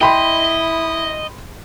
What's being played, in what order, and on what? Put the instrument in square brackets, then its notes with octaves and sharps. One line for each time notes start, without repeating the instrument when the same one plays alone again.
[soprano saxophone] E4 [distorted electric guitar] D#5 [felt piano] G5 B5 C6